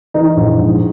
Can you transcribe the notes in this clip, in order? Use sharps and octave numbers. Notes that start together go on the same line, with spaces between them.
E3 D#4
A#1
G#2